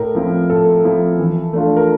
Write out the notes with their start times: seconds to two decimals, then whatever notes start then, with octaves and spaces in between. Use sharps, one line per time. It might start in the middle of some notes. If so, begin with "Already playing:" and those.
Already playing: A2 A#4
0.15 F3 C4 E4
0.50 A2 A4
0.84 F3 C4 E4
1.19 E3
1.53 A3 D4 F4
1.76 A#4